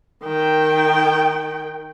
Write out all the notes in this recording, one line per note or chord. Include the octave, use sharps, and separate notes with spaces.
D#3 G5